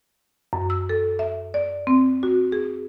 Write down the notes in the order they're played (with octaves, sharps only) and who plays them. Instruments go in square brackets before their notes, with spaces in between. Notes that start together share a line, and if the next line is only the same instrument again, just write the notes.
[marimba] F#2
E6
A4
E5
D5
C4
F#4
G#4